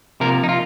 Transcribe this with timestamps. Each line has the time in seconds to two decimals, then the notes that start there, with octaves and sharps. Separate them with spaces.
0.20 C3 F3 A#3 A#4
0.43 D#4
0.49 F4